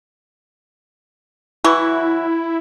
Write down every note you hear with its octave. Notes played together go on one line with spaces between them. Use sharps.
E3 F#3 E4 F#4